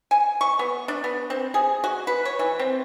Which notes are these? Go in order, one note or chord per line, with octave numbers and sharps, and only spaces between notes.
G#5
C#6
B3
D4
B3
C4
G#4
F#4
B4
C#5
E3
C4